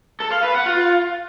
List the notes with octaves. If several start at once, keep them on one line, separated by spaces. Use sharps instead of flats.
A4
F5
B4
F#5
F4